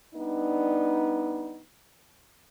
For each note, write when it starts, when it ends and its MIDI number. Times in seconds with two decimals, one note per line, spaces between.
0.14 1.60 55
0.14 1.60 59
0.14 1.60 62
0.14 1.60 63